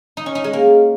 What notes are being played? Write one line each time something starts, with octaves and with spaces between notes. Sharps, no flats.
D#4
C#4
D#4
G#3
A#3